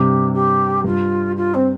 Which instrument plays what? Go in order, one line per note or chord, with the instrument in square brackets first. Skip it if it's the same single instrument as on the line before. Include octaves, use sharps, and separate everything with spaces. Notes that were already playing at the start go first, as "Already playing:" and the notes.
Already playing: [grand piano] G2 C3 [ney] G4
[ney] G4
[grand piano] G2 [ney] F4
[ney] F4
C4